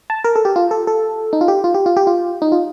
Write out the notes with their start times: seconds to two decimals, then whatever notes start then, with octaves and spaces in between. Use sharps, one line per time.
0.10 A5
0.24 A#4
0.36 A4
0.45 G4
0.56 F4
0.71 A4
0.87 A4
1.33 D#4
1.41 F4
1.48 G4
1.64 F4
1.74 G4
1.86 F4
1.97 G4
2.07 F4
2.42 D#4
2.52 F4